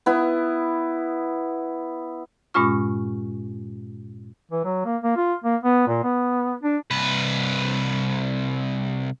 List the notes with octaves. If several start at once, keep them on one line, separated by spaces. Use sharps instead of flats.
B3 E4
G2 A#2 G#3 C#4 F4 C#6
E3
F#3
A#3
A#3
F4
A#3
B3
A#2
B3
D4
C2 B4